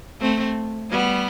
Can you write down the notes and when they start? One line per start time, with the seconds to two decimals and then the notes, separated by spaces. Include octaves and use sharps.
0.20 A3 C4
0.91 G3 B3